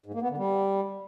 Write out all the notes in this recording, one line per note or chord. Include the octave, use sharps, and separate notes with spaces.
G#2
A#3
B3
D3
G3